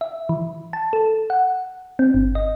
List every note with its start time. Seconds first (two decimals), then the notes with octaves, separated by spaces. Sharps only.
0.01 E5
0.29 E3
0.73 A5
0.93 A4
1.30 F#5
1.99 C4
2.14 G1
2.35 D#5